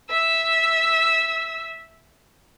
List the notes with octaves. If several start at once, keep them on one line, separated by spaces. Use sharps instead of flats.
E5 E6